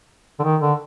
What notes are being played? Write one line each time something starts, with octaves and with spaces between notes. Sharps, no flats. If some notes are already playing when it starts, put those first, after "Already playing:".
D3
D#3
D3